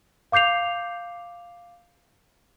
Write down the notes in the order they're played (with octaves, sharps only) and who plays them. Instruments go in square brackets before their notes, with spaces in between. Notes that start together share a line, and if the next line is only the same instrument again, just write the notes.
[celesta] F5 D6 G6 C7 F7